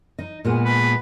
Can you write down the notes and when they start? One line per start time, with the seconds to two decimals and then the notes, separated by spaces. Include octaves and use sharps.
0.18 D#4
0.45 A#2 G#3 B3
0.65 B4